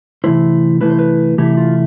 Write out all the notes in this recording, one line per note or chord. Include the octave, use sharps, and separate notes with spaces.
C3 E3 A3 E4 C5
C3 E3 A3 E4 B4
C5
B4
C3 E3 A3 E4 G4
F4